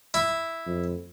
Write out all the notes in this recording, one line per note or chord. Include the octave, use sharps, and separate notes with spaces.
E4
F2